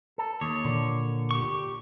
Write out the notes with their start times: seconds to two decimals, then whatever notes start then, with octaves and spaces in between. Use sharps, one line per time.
0.18 A4
0.41 D#2 C#5
0.65 A#2 D3
1.31 G4 C#6